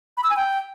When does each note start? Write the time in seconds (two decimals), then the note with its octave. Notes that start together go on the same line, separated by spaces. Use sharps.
0.17 B5
0.24 E6
0.30 G#5
0.36 G5